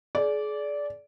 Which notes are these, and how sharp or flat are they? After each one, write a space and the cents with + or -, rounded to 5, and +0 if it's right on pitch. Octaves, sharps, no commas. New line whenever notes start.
G#4 +35 D5 -15